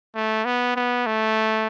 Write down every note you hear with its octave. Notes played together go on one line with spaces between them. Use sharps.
A3
B3
B3
A3